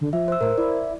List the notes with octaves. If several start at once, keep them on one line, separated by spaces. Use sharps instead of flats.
D3
F3 E5
C5 E6
A2 A#4 C5
E4 D5